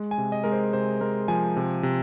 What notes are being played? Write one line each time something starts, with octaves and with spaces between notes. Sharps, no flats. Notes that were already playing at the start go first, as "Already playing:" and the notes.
Already playing: G#3
G#5
C3
D#5
G#3 A#4
C5
C3 C5
G#3 A#4
F3 G#5
C3
C3